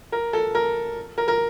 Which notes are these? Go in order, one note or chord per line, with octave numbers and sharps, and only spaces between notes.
A#4
A4
A#4
A#4
A#4